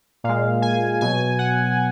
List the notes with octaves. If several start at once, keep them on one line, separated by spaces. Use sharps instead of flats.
A#2 G#3 F5
G#5
B2 F#3 G#5
F#5